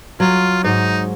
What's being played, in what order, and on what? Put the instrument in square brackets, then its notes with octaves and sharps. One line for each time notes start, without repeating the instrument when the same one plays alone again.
[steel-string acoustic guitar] F#3 [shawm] F4
[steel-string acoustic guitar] G#2 [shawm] D#4